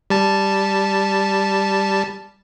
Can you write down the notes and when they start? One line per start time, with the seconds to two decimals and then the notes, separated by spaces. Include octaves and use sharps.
0.10 G3 A5